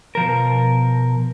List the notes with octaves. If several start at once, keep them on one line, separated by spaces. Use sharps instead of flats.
B2 F3 A#4